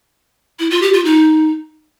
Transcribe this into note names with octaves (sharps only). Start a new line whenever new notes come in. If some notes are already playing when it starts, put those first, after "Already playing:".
E4
F4
G4
F4
D#4